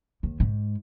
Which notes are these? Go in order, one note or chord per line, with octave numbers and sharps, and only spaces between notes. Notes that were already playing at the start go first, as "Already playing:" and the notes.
D#2
G#2